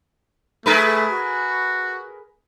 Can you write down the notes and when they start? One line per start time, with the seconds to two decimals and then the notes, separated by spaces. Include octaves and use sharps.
0.66 A3 G#4 A#4 B4
1.11 F#4